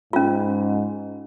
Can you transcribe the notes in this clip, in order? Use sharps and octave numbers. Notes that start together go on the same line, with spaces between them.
G#2 C#4 F4